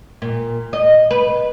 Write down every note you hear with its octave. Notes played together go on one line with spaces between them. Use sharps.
A#2
D#5
B4